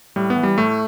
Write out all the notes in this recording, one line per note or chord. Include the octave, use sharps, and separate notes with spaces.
A2 G3
B3
E3
G3
A2 A3